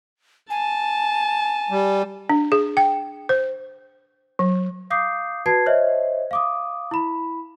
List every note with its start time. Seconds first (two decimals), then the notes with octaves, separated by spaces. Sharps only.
0.50 G#5 A5
1.71 G3
2.29 D4
2.52 G#4
2.77 G5
3.29 C5
4.39 F#3
4.90 F5 D6 D#6 G6 C7
5.46 F#4 B4 A5 G#6 C7
5.66 C5 C#5 D#5 E5
6.31 F5 D6 D#6
6.91 E4 B5